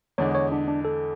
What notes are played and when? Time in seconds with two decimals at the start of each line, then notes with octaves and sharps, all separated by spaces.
0.18 E2 D3 G#3 C#5
0.35 C#5
0.52 D4
0.68 D4
0.85 A4